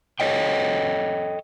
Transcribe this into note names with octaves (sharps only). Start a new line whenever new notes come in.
A4 C#5 D#5 G5